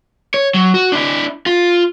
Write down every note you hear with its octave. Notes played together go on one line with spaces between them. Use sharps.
C#5
F#3
F#4
D4 E4
F4